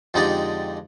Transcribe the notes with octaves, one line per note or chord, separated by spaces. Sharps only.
F2 D3 G#3 D#4 G4 D5